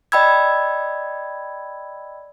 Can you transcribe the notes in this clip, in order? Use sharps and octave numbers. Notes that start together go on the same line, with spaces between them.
D5 D#5 G5 B5 E6 G#6